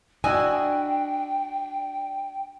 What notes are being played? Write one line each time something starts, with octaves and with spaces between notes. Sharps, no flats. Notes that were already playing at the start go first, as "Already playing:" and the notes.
D4 E4 F#4 D#5 G5 G#5